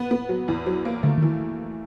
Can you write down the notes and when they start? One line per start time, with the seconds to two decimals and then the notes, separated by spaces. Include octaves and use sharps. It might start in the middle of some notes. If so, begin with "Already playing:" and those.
Already playing: B3
0.11 B3
0.29 F#3
0.48 E2
0.66 F#3
0.85 A#3
1.03 D3 A3
1.18 D#3
1.22 E3